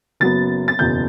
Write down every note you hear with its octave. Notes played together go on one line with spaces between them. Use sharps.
F#1 F#2 F#3 B3 A6
A6
F#1 E2 B2 G6